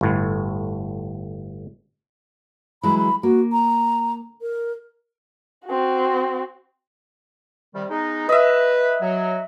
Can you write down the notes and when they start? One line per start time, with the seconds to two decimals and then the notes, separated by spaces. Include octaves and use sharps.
0.01 G1 A2
2.83 E3 F#3 G#3 B5
2.98 B5
3.23 A#3 F#4
3.52 A#5
4.42 A#4
5.65 C4 F#4
7.74 C3 D#3 G3
7.90 G#3 B3 D#4
8.29 B4 D#5 E5
9.01 F#3